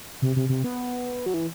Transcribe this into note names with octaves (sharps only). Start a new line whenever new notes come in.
C3
C3
C3
B3
F#3
E3